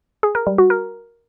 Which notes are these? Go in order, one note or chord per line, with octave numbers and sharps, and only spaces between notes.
G#4
A#4
G3
F#4
A#4